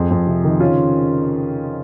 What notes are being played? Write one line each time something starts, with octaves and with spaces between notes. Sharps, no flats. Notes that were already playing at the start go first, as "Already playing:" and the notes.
Already playing: F2 G#4
F2
C3
D#3
C#3 C#4 F4